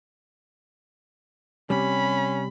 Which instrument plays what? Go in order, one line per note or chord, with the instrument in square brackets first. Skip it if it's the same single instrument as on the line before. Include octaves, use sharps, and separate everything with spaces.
[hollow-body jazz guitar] C3 G3 [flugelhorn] C#4 [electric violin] B5